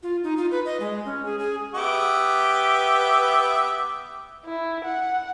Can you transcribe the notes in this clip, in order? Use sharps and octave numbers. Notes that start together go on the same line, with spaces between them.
F4
D#4
F4
B4
D#5
G#3
C#4
G#4
G#4
B3 G4 E5
E4
F#5